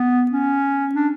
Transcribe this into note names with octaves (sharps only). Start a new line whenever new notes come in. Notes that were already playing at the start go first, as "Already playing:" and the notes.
Already playing: B3
C#4
D4